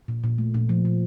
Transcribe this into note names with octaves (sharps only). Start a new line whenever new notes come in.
A#2
A#2
A3
A#2
F3
A#2